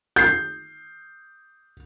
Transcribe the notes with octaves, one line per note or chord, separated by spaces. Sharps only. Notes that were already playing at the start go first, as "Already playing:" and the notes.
G6 C7